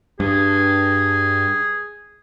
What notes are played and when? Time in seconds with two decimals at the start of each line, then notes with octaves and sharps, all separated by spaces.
0.20 G2 G#4